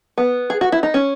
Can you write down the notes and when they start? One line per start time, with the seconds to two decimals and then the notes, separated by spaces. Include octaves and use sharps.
0.18 B3
0.50 G#4
0.61 F#4
0.72 E4
0.83 D#4
0.94 C#4